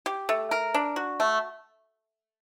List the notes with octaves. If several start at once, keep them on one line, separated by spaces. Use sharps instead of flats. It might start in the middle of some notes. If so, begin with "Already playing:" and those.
G4
A3
A#4
D4
F#4
A3